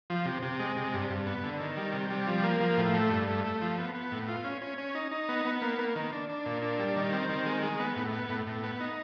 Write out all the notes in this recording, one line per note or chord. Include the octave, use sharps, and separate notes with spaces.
F3
C3
C3
G#3
C3
G2
G2
B3
D3
D#3
G3
C3
G3
F3
A#3
F3
A2
A3
G2
A3
A3
F3
B3
B3
A2
F4
C#4
C#4
C#4
D#4
D#4
B3
B3
A#3
A#3
D#3
D4
D4
A#2
D4
G3
D#3
C4
D#3
G#3
G#3
B3
A2
B3
A2
A2
B3
D#4